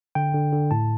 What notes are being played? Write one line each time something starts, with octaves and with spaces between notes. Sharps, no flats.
D3 G5
D3
D3
A2 A5